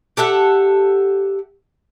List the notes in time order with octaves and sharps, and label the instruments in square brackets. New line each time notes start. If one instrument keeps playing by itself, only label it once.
[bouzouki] G4 A4 E5 F#5